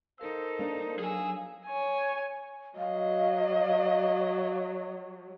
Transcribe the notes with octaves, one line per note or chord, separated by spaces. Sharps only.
D#4 A4 A#4 C5 F5 E6
A#3 D4 F5
F#3 G#4 G#5 E6
C#5 G#5
F#3 D#5 F5